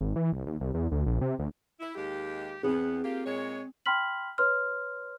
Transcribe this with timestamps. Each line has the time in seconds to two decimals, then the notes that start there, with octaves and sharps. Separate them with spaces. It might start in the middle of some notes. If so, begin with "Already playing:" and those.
0.01 G#1
0.16 E3
0.33 C2
0.47 D#2
0.61 C2
0.74 E2
0.92 D2
1.06 A#1
1.21 C3
1.39 D2
1.80 E4
1.95 D#2 G#3 G4
2.63 E2 B3 C4 G#4
3.03 A#3 F4 G4
3.25 A#2 G#3 C#5
3.86 G5 B5 C6 F6 B6 F#7
4.38 B4 C#5 C6 F6